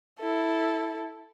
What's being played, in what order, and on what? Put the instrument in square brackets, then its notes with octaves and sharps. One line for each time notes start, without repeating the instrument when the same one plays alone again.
[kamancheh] E4 A4